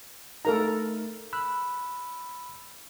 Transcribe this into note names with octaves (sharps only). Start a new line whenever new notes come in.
A3 D#4 A4 A#4 A#5
B5 E6 F#6